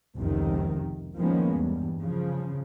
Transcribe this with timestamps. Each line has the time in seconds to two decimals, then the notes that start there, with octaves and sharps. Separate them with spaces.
0.17 F1 C#2 C3 D#3
1.17 D#3 F3 G#3 A#3 B3 C#4
1.53 E2 G2
2.01 C#3 F3